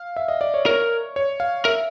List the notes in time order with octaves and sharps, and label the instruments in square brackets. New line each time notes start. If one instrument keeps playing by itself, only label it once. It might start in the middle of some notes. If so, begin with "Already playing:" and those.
Already playing: [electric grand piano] F5
E5
D#5
D5
C#5
[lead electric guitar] A#4 [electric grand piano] C#5
[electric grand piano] C#5
F5
[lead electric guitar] A#4 [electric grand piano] E5